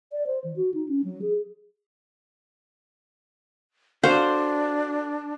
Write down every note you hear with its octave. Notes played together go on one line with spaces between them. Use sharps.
D5
C5
E3
F#4
D#4
C#4
F#3
G#4
D4 F#4 A4 C5 F5